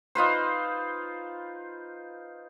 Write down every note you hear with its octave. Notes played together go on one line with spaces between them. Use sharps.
D#4 F4 B4 C5